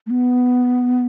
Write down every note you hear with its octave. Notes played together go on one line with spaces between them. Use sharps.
A3
B3